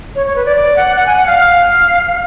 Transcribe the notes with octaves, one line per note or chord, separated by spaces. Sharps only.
C#5
C#5
B4
D5
D5
F#5
F#5
G#5
F#5
F5